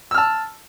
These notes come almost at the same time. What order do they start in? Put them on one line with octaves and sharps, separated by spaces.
E6 F6 A5